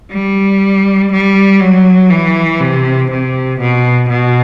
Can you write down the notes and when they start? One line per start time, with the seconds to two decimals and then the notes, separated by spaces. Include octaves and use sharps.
0.11 G3
1.12 G3
1.60 F#3
2.10 E3
2.61 C3
3.11 C3
3.60 B2
4.09 B2